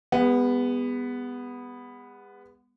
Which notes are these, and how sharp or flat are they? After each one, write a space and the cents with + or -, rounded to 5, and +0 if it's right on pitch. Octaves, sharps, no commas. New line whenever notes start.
G#3 -40 B3 +0